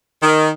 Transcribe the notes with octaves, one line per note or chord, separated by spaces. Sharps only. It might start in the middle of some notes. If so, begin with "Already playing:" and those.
D#3